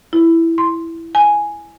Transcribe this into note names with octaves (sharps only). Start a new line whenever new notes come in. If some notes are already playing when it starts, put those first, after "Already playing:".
E4
C6
G#5